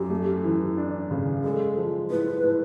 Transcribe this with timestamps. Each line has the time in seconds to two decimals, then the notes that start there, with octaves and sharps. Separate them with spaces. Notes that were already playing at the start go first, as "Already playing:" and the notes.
Already playing: F#2 G4
0.10 A3
0.44 E3
0.77 D4
1.11 C#3
1.44 G#3 A4
1.77 F3
2.10 A2 B4
2.44 A2